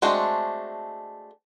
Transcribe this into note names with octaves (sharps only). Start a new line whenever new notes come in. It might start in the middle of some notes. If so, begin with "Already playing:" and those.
G#3 A3 C4 D4 F#4